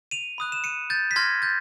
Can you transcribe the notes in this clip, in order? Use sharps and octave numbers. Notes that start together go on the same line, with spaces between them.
D#7 F7
B5 D#6 F#6
E7
C#7 D#7
G6 A6
B6
C6 F6 G#6 A#6
G6 A6